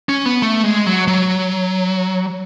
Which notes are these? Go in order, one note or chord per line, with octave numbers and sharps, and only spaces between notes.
C#4
B3
A3
G#3
F#3
F#3